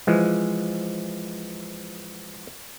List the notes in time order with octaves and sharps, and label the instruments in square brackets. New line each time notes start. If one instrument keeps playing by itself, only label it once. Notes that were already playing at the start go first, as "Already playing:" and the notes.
[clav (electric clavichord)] E3 F3 G#3